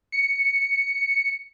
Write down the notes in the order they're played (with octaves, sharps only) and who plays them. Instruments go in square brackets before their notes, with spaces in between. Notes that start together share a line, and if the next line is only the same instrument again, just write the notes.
[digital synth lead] C#7